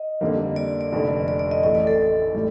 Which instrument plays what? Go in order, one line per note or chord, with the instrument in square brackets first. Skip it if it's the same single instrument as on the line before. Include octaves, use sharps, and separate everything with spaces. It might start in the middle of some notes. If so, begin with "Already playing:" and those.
Already playing: [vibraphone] D#5
[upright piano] F2 D3 G3 A#3
[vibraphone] D5
D5
[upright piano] F1 F2 D3
[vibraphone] D5
D5
D#5
[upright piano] A1 A2 A3 [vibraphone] D#5
[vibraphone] D5
A4
[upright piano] A2 G3